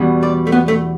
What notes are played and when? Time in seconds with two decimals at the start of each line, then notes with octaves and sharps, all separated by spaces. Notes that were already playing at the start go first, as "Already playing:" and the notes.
Already playing: E2 B2 G3
0.23 D5
0.47 A3
0.52 B3
0.68 A3